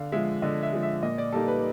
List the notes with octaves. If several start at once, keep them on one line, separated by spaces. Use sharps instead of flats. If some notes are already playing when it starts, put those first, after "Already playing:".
Already playing: D3 F5
F3 G#3 E5
D3 D#5
E5
F3 G#3
E5
A#2 D#5
D5
G3 A#3 D#4 A4
B4